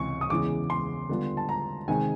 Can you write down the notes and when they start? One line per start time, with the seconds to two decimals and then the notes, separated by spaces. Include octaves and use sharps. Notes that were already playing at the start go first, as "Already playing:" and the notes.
Already playing: C#2 C3 E3 C#6
0.21 D#6
0.30 E2 C#3 E3 G#3 D6
0.70 C6
1.09 D3 G3 B3 D4 F4
1.37 A5
1.49 A#5
1.88 C3 D#3 G#3 G#5